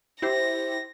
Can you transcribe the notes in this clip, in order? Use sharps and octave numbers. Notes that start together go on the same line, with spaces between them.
E4 G4 C5 A#6